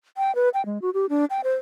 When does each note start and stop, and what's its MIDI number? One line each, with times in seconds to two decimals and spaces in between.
0.17 0.34 79
0.35 0.49 71
0.54 0.64 79
0.66 0.81 56
0.82 0.90 66
0.94 1.06 67
1.09 1.25 62
1.30 1.41 79
1.44 1.55 72